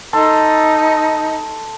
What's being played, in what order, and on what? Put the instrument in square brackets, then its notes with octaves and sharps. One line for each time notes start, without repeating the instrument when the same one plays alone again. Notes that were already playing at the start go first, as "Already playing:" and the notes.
[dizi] D#4 [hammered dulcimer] A4 C6